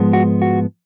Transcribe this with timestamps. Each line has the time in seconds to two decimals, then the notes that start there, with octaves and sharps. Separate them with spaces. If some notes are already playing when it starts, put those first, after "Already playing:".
Already playing: G#2 F3 G#3 B3
0.13 F#4
0.42 F#4